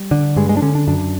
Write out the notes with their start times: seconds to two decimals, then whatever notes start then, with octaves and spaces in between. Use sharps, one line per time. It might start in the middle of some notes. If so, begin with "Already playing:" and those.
Already playing: G3
0.11 D3
0.36 G2 G#3
0.49 G#3
0.57 D4
0.62 D3 C#4
0.75 D4
0.87 F#2 D4